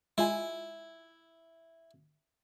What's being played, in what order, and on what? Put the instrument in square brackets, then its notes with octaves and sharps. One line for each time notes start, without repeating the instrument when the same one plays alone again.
[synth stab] G#3 F4 G#5 [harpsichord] E4